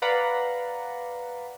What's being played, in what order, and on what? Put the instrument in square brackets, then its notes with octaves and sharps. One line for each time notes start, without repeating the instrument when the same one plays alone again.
[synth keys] B4 D5 F5 F#5 A#5 B5